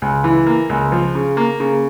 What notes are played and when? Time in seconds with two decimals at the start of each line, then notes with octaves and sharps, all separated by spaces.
0.02 C#2
0.24 E3
0.47 A#3
0.69 C#2
0.92 F3
1.15 C#3
1.37 A#3
1.60 C#3